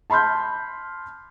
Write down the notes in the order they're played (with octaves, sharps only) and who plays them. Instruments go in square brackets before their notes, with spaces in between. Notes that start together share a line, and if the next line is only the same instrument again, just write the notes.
[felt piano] A5 B5 C6 F6 G6